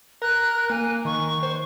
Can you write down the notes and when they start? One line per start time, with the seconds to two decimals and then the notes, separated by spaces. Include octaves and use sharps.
0.22 A#4 F#6
0.70 A#3 G#5
1.05 D#3 C#6
1.43 C5